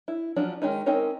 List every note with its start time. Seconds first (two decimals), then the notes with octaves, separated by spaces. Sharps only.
0.08 E4
0.36 F3 F#3 C#4 D4 F4
0.62 D#3 G#3 C#4 D#4
0.86 C4 C#4 D#4 A#4 C#5